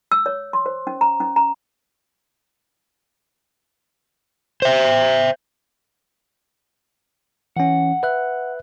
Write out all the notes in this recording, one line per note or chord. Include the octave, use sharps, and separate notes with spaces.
E6
C#5
C6
C5
C#4
A#5
C#4
A#5
C5 E5
E3 C#4 F#5
B4 E5 F#6